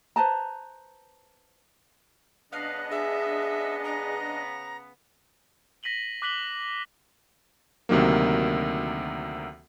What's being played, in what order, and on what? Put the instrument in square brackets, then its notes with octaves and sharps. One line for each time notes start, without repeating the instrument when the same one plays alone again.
[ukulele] B4 C5 A5 A#5
[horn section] C#3 B3 [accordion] D4 D#5 [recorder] F5 [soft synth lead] F#6
[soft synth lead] G#4 [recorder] E5
[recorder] A#5
[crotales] A#6 B6 D#7 F#7 G7
D6 F#6 B6 F#7 G7
[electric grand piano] D2 C3 D#3 F#3 A#3